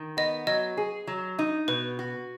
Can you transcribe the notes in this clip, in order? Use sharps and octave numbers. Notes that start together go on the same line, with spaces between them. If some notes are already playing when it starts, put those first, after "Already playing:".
Already playing: D#3
B3 D#5
F#3 D#5
G#4
F#3
D#4
B2 B4
F#4